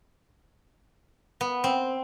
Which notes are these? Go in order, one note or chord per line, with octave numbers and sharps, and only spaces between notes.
B3
C4